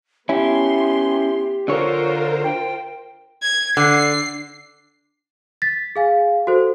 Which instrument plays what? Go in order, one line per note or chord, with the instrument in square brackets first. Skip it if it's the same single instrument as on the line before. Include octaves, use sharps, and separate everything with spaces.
[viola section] B3 C6 [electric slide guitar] C#4 E4 [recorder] G4
[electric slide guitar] D3 C#5 [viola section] F4 A#4 C5
[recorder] G5
[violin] G#6
[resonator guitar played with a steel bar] D3 [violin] C7
[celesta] A6 B6
G#4 F5 G#5
F#4 A4 C5